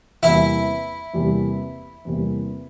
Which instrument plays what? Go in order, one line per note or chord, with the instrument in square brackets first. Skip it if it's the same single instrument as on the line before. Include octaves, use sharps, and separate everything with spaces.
[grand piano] E2 C3 E3 G3 A#3 [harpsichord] E4
[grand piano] E2 C3 E3 G3 A#3
E2 C3 E3 G3 A#3